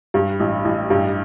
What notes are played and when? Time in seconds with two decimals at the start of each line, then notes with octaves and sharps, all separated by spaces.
0.14 G2
0.40 A1
0.65 A1
0.90 G2